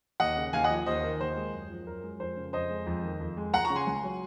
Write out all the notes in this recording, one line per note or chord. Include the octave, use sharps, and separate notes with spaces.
D#2 D#5 F#5
C#3
D#2 F5 G#5
D#5 F#5
F3
D#2 C5 D#5
D#3
D#2 C5
G#3
F#2
F3
F#2 A#4
G#3
F2 C5
C#3
F2 C5 D#5
G#3
F2
D#3
F2
G#3
C#2 F#5 A#5
A#5 C#6
C#3
G#5 C6
C#2
F#3